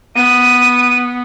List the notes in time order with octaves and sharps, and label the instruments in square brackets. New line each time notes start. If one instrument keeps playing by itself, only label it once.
[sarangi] B3 [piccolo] D#7